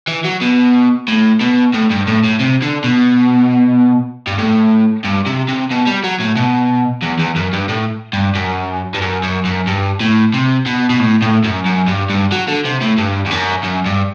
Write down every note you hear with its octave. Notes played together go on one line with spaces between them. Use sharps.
E3
F#3
B2
A2
B2
A2
G2
A2
A2
C3
D3
B2
G2
A2
G2
C3
C3
B2
G3
F#3
A2
B2
E2
E2
F#2
G2
A2
G2
F#2
G2
F#2
F#2
F#2
G2
A2
C3
B2
B2
A2
A2
F#2
F#2
G2
G2
F#3
D3
C3
A2
G2
E2
F#2
F#2
G2